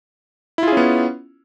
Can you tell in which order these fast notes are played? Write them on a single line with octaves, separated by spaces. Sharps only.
E4 F4 G#4 C#4 B3